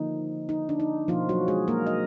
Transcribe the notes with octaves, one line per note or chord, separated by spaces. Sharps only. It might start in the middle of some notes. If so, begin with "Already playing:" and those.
Already playing: D3 F3 A#3 D#4
D#4
D4
D#4
B2 F3 A#3 F4
F#3 F#4
G#3 G#4
A#3 A#4
D#5